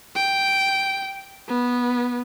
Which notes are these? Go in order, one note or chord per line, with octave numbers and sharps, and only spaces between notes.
G5
B3